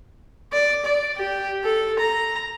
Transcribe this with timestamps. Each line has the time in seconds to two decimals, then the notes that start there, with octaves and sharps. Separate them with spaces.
0.53 D5
0.85 D5
1.17 G4
1.64 A4
2.00 A#5